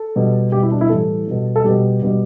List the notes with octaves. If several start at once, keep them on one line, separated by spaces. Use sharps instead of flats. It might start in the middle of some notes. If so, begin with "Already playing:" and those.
Already playing: A4
B2 G3
B2 G3 G4
E4
D4
E4
A2 E3 G3 A4
B2 G3
A4
B2 G3 G4
B2 G3